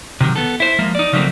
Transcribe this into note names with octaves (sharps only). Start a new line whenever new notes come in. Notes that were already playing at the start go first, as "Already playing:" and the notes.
C3 D#3 F#3
B3 A4
E4 C5
F3 G#3 A#3
D#4 D5
C#3 F3 F#3 A3 A#3 C4